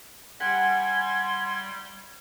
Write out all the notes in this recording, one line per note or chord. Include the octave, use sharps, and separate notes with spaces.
G3 G4 F#5 G#5 C6 G#6